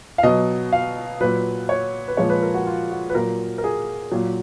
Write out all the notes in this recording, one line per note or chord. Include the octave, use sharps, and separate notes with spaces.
F5
B2 F#3 D#5
F5
A#2 F#3 B4
C#5
B4
A#2 F3 G#3 C#5
B4
A#4
F#4
F4
F#4
B4
A#2 F#3 A#4
A#4
G#4
A#2 F#3